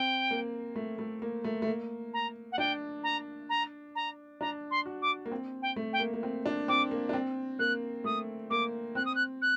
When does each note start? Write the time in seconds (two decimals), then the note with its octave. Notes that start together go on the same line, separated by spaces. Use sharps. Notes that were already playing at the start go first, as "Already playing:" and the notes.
Already playing: C4 G5
0.31 A#3
0.76 A3
0.99 A3
1.22 A#3
1.44 A3
1.62 A3
1.67 A#3
2.13 A#5
2.52 F#5
2.58 D4 G5
3.03 A#5
3.49 A#5
3.95 A#5
4.41 D4 A#5
4.70 C6
4.86 F#4
5.02 D6
5.26 A#3
5.32 C4
5.62 G5
5.76 A3
5.93 G5
6.00 A#3
6.14 A#3
6.23 C4
6.46 D4
6.68 C4 D6
6.91 A#3
7.09 D4
7.13 C4
7.59 A#3 F#6
8.04 A3 D#6
8.50 A#3 D6
8.95 C4 F#6
9.05 D#6
9.15 F#6
9.41 F#6